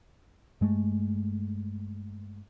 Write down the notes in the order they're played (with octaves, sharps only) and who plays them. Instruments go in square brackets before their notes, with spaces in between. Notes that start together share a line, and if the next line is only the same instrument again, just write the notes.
[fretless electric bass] G2 G#3 A3